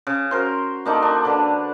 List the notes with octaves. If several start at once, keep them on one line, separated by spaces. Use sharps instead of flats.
C#3
F#4 A#4 C5
A#3 D4 D#4 A4
D4
D3 B4